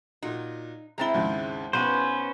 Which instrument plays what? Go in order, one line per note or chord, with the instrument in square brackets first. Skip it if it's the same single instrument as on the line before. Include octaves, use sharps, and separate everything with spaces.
[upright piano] A#2 F#4 [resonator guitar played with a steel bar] D#4
[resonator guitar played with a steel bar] G#3 C4 E4 [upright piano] A#5 A6 G7
[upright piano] D#2 G#2 C#3
[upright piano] B1 B3 D#7 [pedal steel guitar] C#4 B4 C5